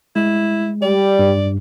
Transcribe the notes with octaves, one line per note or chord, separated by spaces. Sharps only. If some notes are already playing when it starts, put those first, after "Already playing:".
G#3 E4
G3 D5
G2